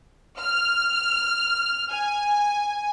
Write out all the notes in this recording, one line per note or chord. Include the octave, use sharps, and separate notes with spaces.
F6
G#5